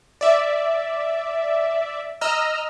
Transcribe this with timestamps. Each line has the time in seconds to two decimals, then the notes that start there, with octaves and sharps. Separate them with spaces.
0.21 D5 E5
2.21 D#5 A#5 E6 F6